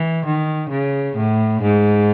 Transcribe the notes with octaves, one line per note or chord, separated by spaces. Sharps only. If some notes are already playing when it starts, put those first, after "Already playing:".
Already playing: E3
D#3
C#3
A2
G#2